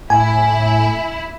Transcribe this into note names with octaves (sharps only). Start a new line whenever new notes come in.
A2 E4 G#5